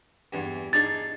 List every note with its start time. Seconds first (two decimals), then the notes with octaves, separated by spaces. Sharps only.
0.33 E2 G2
0.73 D4 D#4 G#4 A6